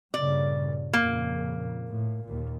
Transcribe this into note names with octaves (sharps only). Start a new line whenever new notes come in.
G2 A#2 C#3 D5
F2 A#2 C#3 A#3
A2
D#2 A#2